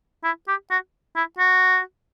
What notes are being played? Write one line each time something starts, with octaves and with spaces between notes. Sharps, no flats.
E4
G4
F#4
E4
F#4